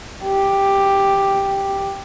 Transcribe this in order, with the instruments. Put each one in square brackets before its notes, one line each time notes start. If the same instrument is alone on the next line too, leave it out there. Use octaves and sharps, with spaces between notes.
[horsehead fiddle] G4